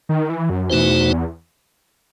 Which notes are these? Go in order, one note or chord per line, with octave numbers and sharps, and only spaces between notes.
D#3
E3
F#2
E2 B2 A3 D#4 F#4 C5